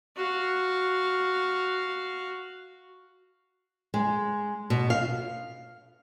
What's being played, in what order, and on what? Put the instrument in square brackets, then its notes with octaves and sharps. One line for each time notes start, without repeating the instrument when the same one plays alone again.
[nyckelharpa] F#4 F5
[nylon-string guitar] G#3
B2
F5